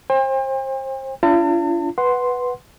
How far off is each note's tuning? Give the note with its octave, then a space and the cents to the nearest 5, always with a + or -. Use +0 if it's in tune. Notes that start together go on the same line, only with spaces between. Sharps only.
C5 +30 G5 +45
D4 -40 F4 -45 A5 +40
B4 +0 F#5 +0 C6 +0